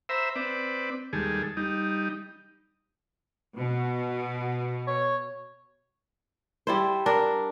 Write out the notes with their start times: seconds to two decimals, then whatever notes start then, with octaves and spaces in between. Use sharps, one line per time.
0.09 C5 E5 A#5 B5
0.36 C4 B4 D5
1.13 D#2 G3 G#3 G#4 A4
1.57 G3 D#4
3.57 B2
4.87 C#5
6.67 G3 E4 C5
7.06 D4 A#4